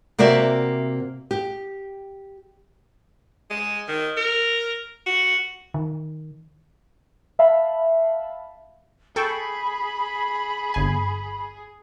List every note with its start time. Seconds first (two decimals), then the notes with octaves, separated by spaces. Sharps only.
0.19 C3 A#3 F#4 D5 E5
1.31 G4
3.50 G#3
3.88 D#3
4.17 A#4
5.06 F#4
5.74 D#3
7.39 E5 F5 A5 B5
9.16 G#4 A4 G5 B5 C#6
10.74 G1 G#5